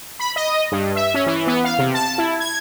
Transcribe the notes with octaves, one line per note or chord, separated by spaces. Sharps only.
B5
D#5
G2
E5
C#4
E3
B3
F5
C3
A5
E4
G#6